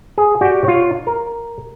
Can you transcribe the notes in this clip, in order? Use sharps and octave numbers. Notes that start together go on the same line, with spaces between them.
G#4
F#4 G4 D5 G5
F4 C#5
A#4